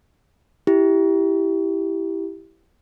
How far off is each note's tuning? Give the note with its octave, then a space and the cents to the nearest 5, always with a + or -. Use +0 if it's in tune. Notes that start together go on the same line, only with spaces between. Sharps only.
E4 +0 G4 +0